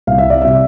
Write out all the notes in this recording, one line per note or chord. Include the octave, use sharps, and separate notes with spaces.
C2 F5
E5
D5
C3 G3 E5